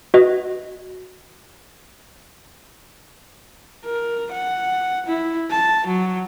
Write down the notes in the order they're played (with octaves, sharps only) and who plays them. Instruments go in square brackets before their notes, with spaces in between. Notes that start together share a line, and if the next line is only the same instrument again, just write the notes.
[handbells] F#4 B4 D#5
[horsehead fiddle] A#4
F#5
E4
A5
F#3